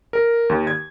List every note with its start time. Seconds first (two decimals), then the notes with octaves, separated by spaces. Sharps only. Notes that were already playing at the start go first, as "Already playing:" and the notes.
0.13 A#4
0.50 D#2
0.67 G#6